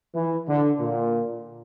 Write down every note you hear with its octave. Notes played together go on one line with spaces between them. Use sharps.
E3
D3
A#2